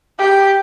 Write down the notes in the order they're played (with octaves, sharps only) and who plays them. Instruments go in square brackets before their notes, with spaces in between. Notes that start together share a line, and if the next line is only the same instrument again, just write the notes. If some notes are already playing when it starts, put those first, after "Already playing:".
[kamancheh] G4